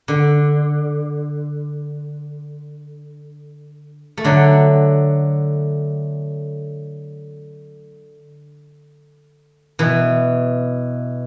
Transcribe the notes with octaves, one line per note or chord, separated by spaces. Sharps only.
D3
A3
D3 F#3
B2 E3